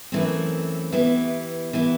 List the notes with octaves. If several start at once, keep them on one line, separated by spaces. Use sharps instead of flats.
F#2 E3 A3 C4
E3 B3 E4 G4
E3 B3 E4 G4